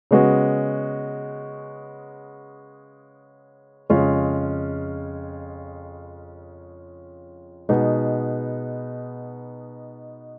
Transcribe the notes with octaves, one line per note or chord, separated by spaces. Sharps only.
C#3 G#3 B3 F#4
F2 C#3 G#3 C#4 F4
B2 G#3 B3 D#4